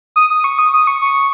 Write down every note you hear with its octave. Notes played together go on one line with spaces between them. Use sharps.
D#6
D#6
C#6
D#6
D#6
C#6
C#6